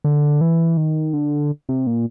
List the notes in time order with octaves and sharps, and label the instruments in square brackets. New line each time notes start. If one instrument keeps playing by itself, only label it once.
[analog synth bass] D3
E3
D#3
D3
C3
A#2